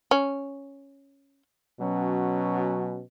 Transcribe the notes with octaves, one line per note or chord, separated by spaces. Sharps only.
C#4
B2 F#3 C#4